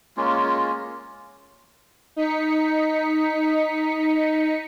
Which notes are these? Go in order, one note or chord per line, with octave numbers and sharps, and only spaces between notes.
G#3 A#3 C#4 F4
D#4 B6 C#7